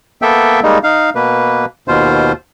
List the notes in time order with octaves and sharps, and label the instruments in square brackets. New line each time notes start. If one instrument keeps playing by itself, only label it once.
[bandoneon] A#3 B3 A4 E5 G5
G3 G#3 A#3 D#4
D#4 F5
B2 A#3 B4
D#2 B2 F4 C5